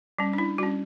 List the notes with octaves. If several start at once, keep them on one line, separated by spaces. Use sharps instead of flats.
G3 C#4
D4
E4
G3 C#4 F#4